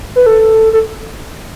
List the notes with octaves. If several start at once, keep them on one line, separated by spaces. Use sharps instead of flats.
B4
A4
A4